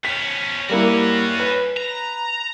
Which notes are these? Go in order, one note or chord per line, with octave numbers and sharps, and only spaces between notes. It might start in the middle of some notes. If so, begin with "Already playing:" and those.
F3 C#4 B6
G3 A#3 C#4 E4 F#4
B4
A#5